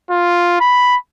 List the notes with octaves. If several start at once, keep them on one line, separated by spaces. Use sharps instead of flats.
F4
B5